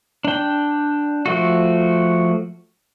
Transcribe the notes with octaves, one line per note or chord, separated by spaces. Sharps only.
D4 G5
F3 A3 F#4